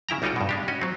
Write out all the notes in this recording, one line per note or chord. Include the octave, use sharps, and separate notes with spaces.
C#3 E4 G5 A#5
B1 G3 D#4 F4 F#4 G5
G2 B2
G#3 D4 G4
C#4 F#4 D#5
F#3 C4